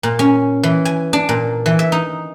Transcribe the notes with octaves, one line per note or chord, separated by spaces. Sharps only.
A#2
C#4
E3
G#5
D4
A#2
E3
E5
D#4